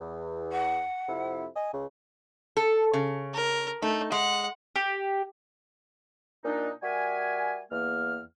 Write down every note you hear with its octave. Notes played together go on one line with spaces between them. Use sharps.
E2
F#5
F2 C3 E4
D#5 G#5
C#2 C#3
A4
C#3
A#4
A3 D#4
G#3 F#5
G4
A#2 D4 D#4
G3 F#4 A#4 E5 G#5
E2 A#3 F6